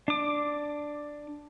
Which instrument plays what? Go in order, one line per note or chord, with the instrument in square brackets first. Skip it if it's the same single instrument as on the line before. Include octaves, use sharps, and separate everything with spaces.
[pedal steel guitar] D4 D6